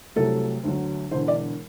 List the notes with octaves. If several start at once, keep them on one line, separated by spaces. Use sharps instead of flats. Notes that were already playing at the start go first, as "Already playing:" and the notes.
C2 C3 F#3 A3 A4
D2 D3 F#3
E1 E2 D3 C5
D5